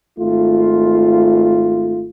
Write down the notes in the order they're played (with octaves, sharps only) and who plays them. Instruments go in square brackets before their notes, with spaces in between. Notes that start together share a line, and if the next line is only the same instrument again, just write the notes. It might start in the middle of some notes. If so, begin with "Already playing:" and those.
[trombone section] G#1 A3 F4